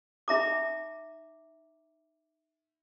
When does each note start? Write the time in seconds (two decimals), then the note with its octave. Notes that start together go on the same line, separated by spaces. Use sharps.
0.28 D#4 E5 A#5 D6